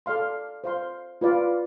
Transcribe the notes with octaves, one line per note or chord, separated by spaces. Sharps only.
A4 D5 F5 C6
C5 F5 C6
F4 B4 D5 F5